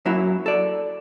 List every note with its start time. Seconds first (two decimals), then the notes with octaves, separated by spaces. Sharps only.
0.05 F#2 F#3 A#3 E4
0.46 A4 D5